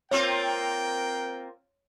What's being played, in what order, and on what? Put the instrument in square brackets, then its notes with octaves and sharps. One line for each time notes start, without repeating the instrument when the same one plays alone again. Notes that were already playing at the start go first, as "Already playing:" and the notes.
[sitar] A#3 C4 F4 [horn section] A#4 G5 [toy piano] C#5